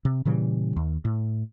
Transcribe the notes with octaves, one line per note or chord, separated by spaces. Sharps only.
C3
A#2 C#3 E3 G3
D#2
A2